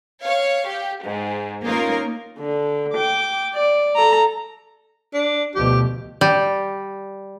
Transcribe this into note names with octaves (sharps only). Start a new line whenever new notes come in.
C#5 F5
G4
G#2
A#3 C#4 D#4 F4 A#4
D3
G5 D6
D5
A4 A#5
D4
D2 B2 F3 G4
G3